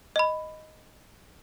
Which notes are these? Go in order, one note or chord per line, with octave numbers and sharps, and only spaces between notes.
D#5 B5